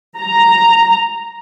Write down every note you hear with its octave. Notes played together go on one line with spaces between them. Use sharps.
A#5